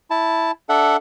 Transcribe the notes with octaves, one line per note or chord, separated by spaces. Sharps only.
E4 A5
D4 A4 E5 F#5